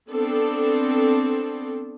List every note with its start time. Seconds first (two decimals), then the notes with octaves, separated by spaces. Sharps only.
0.10 B3 C4 D4 A4